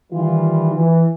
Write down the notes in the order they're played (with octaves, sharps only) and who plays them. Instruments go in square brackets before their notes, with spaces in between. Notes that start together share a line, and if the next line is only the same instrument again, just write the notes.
[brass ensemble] D#3 E3 G3 F4
E3